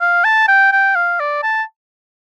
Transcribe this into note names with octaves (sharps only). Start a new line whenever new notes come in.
F5
A5
G5
G5
F5
D5
A5